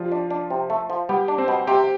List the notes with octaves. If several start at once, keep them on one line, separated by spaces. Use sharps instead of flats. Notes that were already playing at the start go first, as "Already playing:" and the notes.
Already playing: F3 G3 F4
D4
D4
C3
A3
F3
G3 B3 G4
D4
C4 C5
B2
C3 G4 G5